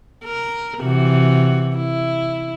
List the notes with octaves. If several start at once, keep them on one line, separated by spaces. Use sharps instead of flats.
A#4
C3 E3 F#4
E4